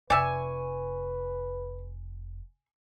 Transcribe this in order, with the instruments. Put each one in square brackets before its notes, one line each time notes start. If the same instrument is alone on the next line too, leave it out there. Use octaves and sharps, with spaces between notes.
[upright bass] F1 [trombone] B4 [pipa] D5 E5 [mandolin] G#5 C#6